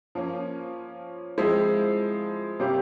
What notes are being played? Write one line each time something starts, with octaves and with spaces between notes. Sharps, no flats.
F3 A#3 C#4
F3 G#3 C4 E4
C3 G3 A#3 C#4 G4